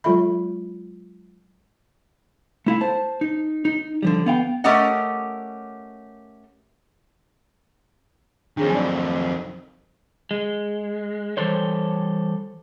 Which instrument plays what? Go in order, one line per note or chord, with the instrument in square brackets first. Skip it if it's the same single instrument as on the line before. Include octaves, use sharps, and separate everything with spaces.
[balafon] F#3 G#3 F4 A4 E5 B5
[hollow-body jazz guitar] A3 E4 F5
C5 A5
D#4
D#4
D3 F3 G3
B3 F5 G5
[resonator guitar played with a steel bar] A3 C#4 G4 A#4 D#5 F#5
[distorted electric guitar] F2 D#3 [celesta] D4 G#4 C#5
[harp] F#3 [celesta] D5 G#5
[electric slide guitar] G#3
E3 G3 A4 C5 C#5